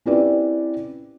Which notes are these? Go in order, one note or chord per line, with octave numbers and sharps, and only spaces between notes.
C4 C#4 E4 G4 B4 D5